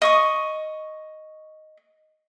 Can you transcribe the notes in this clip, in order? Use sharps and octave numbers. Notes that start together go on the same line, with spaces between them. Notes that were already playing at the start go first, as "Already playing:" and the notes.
D#5 C#6 D#6